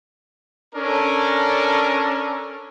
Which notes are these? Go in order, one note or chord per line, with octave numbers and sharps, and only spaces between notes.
C#4 D4 A4 A#4